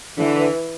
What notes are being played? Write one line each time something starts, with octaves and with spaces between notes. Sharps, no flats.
D3 E3